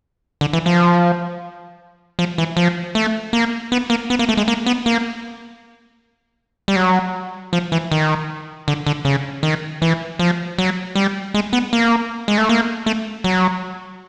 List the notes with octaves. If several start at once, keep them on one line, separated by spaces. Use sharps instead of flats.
D3
E3
F3
F3
E3
F3
A3
A#3
B3
A#3
B3
A#3
A3
G#3
A#3
B3
A#3
G3
F#3
F3
E3
D#3
D3
D3
C#3
D#3
E3
F3
F#3
G3
G#3
B3
A#3
G#3
A3
A#3
A3
F#3